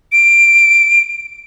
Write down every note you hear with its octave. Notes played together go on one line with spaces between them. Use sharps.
D7